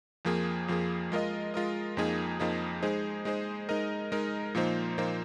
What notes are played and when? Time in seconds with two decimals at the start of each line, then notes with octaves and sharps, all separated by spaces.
0.25 F2 F3 A#3 G#4
0.68 F2 F3 A#3 G#4
1.12 G#3 F4 A#4 D#5
1.54 G#3 F4 A#4 D#5
1.97 F2 F3 A#3 D#4 G#4
2.40 F2 F3 A#3 D#4 G#4
2.82 G#3 D#4 G#4 C5
3.25 G#3 D#4 G#4 C5
3.69 G#3 D#4 A#4 D#5
4.12 G#3 D#4 A#4 D#5
4.55 A#2 F3 A#3 D#4 C5
4.98 A#2 F3 A#3 D#4 C5